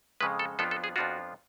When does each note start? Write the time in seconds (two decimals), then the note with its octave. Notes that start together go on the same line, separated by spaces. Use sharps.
0.20 F2 C#3 G#3 B4
0.39 A4
0.59 F2 F3 B3 D4 F4 A4
0.71 A4
0.84 G#4
0.96 F2 F3 B3 D4 F4 F#4